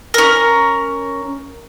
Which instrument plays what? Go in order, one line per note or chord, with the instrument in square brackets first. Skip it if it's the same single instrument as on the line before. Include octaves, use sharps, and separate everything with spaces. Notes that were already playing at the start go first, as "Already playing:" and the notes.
[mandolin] C#4 A#4